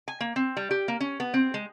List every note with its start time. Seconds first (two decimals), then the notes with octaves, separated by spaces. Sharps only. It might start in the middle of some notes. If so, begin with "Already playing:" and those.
0.08 G#5
0.20 A#3
0.36 C4
0.57 G3
0.71 G4
0.88 A#3
1.00 C#4
1.20 B3
1.34 C4
1.54 G#3